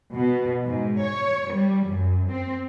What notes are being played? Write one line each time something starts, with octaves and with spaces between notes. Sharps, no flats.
B2
G#2
C#5
G3
F#2
C4